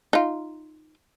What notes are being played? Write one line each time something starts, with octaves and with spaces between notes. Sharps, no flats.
D#4 F4